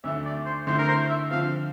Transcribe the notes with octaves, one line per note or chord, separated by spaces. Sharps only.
D2 D3 A3 E5
D5
C5
D3 A3 C4 E4 C5
A#4
C5
E5
D3 F3 C4 F5